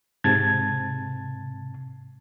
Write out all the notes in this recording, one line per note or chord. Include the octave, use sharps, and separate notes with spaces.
G#2 C3 A5 G#6 A6